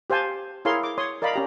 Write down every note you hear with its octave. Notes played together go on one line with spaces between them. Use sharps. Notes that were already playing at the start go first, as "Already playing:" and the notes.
G4 C5 F5 G#5 A5
E4 G#4 A#4 C#5 F5 C6
D6
C#5 C6 D#6
A#4 D5 D#5 F5 B5
C#4 G4 A#5